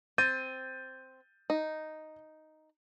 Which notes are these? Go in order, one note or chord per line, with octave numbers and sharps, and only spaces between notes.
C4 G6 A6 D#7
D#4